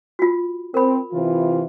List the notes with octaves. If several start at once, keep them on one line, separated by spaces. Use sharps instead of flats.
F4 F#4
C4 A#4 B5
C3 E3 F4